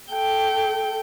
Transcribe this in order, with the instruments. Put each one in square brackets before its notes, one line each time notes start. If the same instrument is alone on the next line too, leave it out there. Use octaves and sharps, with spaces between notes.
[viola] A4 G5